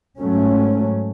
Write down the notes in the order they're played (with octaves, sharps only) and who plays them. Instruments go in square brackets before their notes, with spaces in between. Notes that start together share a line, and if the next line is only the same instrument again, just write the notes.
[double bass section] G#2 F#3 A3 C#4